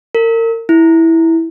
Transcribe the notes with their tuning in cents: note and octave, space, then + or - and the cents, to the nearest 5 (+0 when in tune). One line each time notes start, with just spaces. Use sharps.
A#4 -35
E4 -10